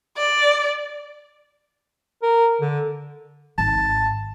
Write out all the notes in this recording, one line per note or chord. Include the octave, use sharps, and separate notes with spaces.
D5
A#4
D3
G#1 A5